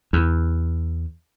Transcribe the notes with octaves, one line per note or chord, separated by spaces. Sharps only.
E2